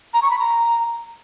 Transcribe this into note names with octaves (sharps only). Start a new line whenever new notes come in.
A#5
C#6
B5
A#5